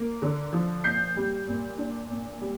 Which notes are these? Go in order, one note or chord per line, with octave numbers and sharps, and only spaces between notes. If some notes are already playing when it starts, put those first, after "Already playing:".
Already playing: A#3
D3
F3
A#2 G6 C7
G3
A#2
D4
A#2
G3